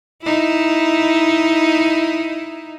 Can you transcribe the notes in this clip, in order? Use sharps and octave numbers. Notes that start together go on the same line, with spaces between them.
D#4 E4